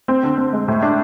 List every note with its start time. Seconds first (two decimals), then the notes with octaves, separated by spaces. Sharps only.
0.08 C4
0.23 D3
0.38 C4
0.53 G#3
0.68 A2
0.82 D4